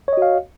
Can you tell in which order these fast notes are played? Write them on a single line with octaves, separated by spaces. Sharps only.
C#5 D#5 F#4 F5